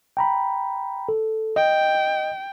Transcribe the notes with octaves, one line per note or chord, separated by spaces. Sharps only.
G5 A#5 B5
A4
D#5 G5